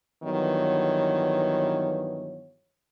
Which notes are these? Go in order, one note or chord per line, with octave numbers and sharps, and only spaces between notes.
G2 D#3 E3 F#3 B3 C#5